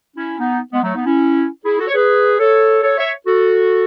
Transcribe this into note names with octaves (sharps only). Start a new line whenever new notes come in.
C#4 E4
B3 D#4
G#3 B3
F#3 A3
B3 D#4
C#4 E4
E4 G#4
F#4 A4
C#5
G#4 B4
A4 C#5
A4 C#5
C#5 E5
F#4 A4